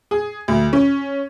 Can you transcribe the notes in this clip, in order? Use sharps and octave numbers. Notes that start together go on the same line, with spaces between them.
G#4
D2
C#4